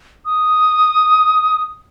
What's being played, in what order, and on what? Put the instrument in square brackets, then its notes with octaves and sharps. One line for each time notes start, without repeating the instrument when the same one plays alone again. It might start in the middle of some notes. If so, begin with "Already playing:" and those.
[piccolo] D#6